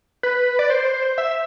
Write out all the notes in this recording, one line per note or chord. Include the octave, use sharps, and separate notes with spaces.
B4
D5
C5
E5